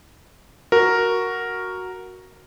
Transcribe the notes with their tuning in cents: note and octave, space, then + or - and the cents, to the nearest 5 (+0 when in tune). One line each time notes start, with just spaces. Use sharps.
F#4 +0 A#4 +0